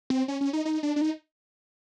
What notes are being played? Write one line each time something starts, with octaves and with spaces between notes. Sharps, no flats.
C4
C#4
C#4
D#4
D#4
D4
D4
D#4